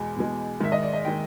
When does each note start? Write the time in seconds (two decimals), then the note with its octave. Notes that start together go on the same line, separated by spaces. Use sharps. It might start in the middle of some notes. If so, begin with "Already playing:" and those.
Already playing: E2 B2 G#3
0.16 E2 B2 G#3
0.60 G#2 D#3 G#3 E5
0.72 D#5
0.83 D5
0.94 D#5
1.05 D#3 G#3 G5